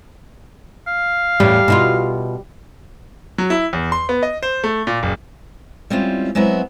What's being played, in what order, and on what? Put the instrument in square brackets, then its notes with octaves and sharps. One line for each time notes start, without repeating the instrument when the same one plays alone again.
[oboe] F5
[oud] E2 A2 C#4 [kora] G3
[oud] B2 E4 F4
[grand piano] F#3
E4
E2
C6
B3
D#5
C5
A3
A#2
F#1
[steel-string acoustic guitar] G3 G#3 C4 C#4 E4 F4
F#3 G#3 B3 C4 E4